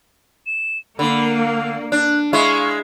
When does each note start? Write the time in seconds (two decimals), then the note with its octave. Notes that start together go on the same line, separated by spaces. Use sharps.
0.46 E7
0.99 D3 A#3 B5
1.37 F5
1.92 D4 F#6
2.33 G#3 E4 F5 C#6